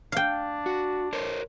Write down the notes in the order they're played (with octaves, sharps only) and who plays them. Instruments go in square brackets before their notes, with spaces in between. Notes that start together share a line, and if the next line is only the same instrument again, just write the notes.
[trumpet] D4 [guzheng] F5 G5
[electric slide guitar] F#4
A#4 C5 C#5